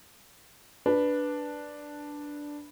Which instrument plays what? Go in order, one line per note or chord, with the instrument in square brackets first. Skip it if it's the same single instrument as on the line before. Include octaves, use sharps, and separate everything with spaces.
[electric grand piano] D4 [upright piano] B4